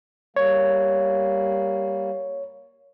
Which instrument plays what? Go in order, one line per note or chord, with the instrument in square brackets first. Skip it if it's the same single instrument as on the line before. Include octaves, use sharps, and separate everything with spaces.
[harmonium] G3 A#3 [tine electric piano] C#5